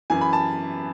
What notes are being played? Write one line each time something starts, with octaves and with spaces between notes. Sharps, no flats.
F#2 E3 G#5
B5
A5